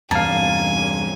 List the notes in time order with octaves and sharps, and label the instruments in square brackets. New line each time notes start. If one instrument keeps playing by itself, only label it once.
[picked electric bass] E2 G2 C3 [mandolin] A#3 [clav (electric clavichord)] F5 A5 [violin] G#5